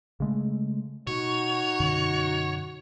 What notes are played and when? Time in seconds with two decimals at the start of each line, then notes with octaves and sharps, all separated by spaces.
0.20 C#3 G#3 A3
1.07 B2 D#4 F#4 C#5
1.80 F#2 B2 D3